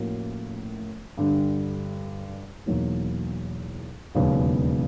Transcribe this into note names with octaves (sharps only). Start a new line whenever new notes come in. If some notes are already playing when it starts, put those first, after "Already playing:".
Already playing: A2 F3 A#3 C#4 F#4
G2 D3 G3
E2 B2 F#3 A#3 D#4
E1 D#2 C#3 F#3 B3